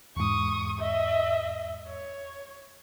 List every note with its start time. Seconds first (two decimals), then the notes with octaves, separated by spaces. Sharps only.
0.16 E2 G#2 C#6 D#6
0.80 D#5 E5
1.87 C#5